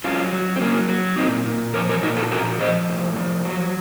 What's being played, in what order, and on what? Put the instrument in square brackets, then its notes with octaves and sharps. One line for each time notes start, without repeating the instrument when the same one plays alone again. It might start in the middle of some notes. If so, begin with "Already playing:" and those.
[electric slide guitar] F#3 C#4 F4
F#3
C4
F#3 A#3 C#4
F#3
A#2 C4 D#4
A#2
F3 A#4 C#5
A#4 C#5
A#2 D#4 F#4
F4 A4
F3 F#4 A#4
F3 C5 D#5
A2
F3
F#3